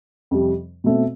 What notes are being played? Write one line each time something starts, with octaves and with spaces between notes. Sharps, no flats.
F2 C3 G3
B2 A3 C4